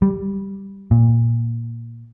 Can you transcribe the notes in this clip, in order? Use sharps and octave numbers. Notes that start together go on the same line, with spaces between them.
G3
A#2